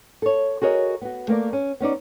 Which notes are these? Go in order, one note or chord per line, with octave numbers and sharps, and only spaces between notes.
A4 C#5
F#4 G#4 A#4 C#5 D#5
B3 F#4
A3 A#3 A#4 D5
C#4
B3 C#4 D#4 D5